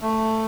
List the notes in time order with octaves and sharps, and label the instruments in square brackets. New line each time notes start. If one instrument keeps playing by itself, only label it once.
[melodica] A3